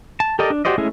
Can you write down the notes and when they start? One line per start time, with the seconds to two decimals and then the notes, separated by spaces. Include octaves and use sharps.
0.20 A5
0.39 G4 A4 A#4 D5 D#5
0.50 D4
0.65 F#4 G4 C5 D5 D#5
0.78 G#3 A3 C#4 E4 G#4